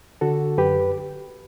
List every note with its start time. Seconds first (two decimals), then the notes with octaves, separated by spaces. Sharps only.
0.21 D3 F#4 A4
0.58 F#2 G4 B4